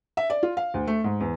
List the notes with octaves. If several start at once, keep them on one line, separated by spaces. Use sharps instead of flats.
E5
D5
F4
F5
D2
A3
G#2
E2